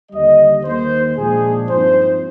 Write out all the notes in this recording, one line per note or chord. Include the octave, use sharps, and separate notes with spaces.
D#2 D3 G3 D#5
D#2 D#3 A#3 C5
A#2 F3 G#3 D4 G#4
G2 F3 C4 D#4 C5